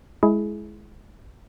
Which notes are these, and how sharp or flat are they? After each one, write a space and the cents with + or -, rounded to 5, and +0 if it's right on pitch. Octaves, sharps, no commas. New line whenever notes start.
G#3 +15 E4 +0 G#4 +25